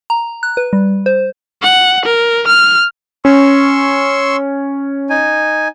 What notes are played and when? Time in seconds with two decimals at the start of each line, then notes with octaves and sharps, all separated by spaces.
0.10 A#5
0.43 F#6
0.57 B4
0.73 G3
1.06 C5
1.62 F#5
2.05 A#4
2.48 F6
3.25 C#4 C6 C#6 E6
5.10 D#4 G#5